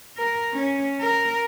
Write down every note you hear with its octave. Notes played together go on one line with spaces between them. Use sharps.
A#4
C#4
A#4